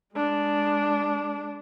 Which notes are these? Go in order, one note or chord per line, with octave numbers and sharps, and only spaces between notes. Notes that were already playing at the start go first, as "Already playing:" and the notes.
G#3 D4